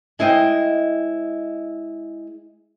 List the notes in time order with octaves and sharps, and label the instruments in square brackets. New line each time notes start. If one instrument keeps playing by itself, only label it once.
[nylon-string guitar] G#3 E4 C5 D#5 E5 G5